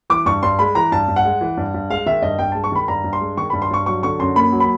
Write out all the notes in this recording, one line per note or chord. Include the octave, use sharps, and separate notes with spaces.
E3 D6
G2 C#6
G2 C6
G#3 B5
E3 A#5
G2 A5
G2
F#5
G#3
E3
G2
G2
G#3 F5
D#3 E5
G2 D#5
G2 G5
G#3 A5
C#6
D#3 B5
G2 A#5
G2
C6
G#3
D#3 C#6
G2 B5
C6
G2 C#6
F#3 C#6
D3 C#6
F#2 C6
A#3 B5
F#3
B5